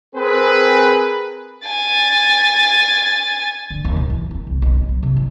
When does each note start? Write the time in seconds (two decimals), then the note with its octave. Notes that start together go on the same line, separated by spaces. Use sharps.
0.15 C4 G#4 A#4 B4
1.67 G#5 A6
3.70 D3
3.84 D#2
3.96 B2
4.10 E3
4.31 C4
4.47 C2
4.62 B1
4.74 B3
4.89 F#3
5.03 C3
5.16 A1